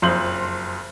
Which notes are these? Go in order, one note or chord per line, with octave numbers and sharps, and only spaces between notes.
F#1 F2 C6 G6 F#7